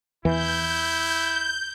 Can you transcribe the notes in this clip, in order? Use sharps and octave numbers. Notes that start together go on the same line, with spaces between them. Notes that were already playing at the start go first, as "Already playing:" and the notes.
E2 E3 E4 G6